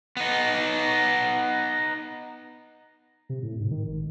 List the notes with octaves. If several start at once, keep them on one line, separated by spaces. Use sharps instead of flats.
B3 D#4
C3
A2
G#2
D#3
G#1